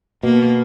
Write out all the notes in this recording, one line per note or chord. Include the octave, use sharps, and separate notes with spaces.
B2 A#3